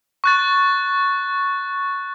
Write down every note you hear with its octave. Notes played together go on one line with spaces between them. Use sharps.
C#6 F#6 A6